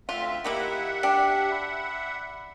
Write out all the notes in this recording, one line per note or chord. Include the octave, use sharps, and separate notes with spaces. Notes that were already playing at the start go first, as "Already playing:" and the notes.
D2 C4 F4 E5 F#5
D#3 A#3 E4 G4 E5 F#5
D4 G5
B5